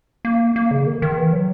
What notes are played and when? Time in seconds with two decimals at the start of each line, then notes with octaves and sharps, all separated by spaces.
0.25 A#3
0.56 A#3
0.71 C#3
0.86 D#3
1.02 D#3
1.18 E3
1.33 F#3